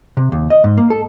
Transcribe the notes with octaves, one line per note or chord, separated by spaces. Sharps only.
C3
D#2
D#5
G#2
A#3
A4